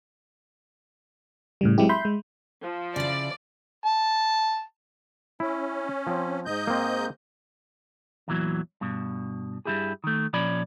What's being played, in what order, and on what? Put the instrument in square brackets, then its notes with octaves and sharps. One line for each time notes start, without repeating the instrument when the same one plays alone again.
[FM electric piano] A2 C#3 G3
F#3 G#3 C4 E4 G4
E5 B5 C6 G6
G#3
[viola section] F3
[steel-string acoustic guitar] C#3 E4 [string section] D5
[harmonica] A5
[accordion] C#4 [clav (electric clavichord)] E4
[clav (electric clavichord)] F3 C4
[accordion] G#2 D#5 G6
[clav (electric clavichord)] A#3 C4
[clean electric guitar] E2 A#2 E3 F#3
G2 B2
G2 D#3 E4 G4 G#4
D#3 A3
A#2 F3 C#4 D5 B5